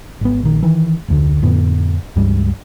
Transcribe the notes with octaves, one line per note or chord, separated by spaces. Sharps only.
G#1 B3
A#1 D#3
D#3 E3
F1 D2 D3
F2 A2 D3 B3
C#2 G2 G3 G#3